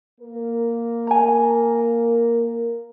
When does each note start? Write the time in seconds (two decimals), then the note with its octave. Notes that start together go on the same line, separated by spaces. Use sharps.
0.20 A#3 A#4
1.07 G#5 A#5